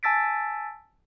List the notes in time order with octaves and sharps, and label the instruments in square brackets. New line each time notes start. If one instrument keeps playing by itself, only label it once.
[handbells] G#5 A5 E6 A6 B6 D7